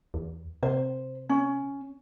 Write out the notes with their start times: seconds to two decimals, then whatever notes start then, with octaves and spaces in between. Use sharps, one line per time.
0.14 E2
0.63 C3 C5
1.29 C#4